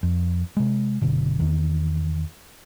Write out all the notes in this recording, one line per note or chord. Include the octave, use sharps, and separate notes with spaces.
F2
C3 G#3
F#1 B2 D3
E2 D#3